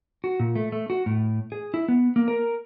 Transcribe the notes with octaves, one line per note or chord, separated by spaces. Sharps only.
F#4
A#2
A3
A3
F#4
A2
G#4
E4
B3
A#3
A#4